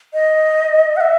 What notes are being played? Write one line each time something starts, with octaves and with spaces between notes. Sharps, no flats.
D#5
F#5
E5